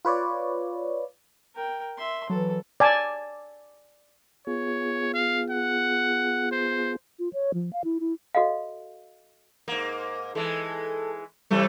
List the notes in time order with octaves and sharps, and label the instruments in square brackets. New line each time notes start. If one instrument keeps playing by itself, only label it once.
[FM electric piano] F4 B4 C#5 D5
[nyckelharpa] A#4 G5
E5 C6
[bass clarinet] E3 [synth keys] F#3 [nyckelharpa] A4
[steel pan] D5 G#5 A5
[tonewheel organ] B3 F4 G#4 [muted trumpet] C#5
[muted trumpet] F5
F#5
C5
[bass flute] F4
C#5
F3
F5
E4
E4
[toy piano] F#4 A4 D#5 F5
[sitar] G#2 A#3
[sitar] E3 G#3 [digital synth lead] A4
[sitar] C3 E3 A3 [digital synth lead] G3